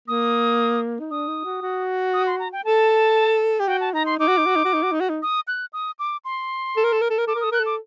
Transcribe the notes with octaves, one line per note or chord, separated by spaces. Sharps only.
A#3 D#6
D#4
D4 D#6
D#4
F#4
F#4
D#6
C6
A#5
G5
A4 A5
G4
F#4 G5
A5
D#4 A#5
C6
D#4 D6
F#4
D#4
F#4
D#4
F#4
D#4
F#4
D#4
F#4
D#4
D#6
F#6
D#6
D6
C6
A4
A#4
A4
A#4
A4
A#4
A4 D6
A#4
A4 D#6
A#4 F#6
A4
D6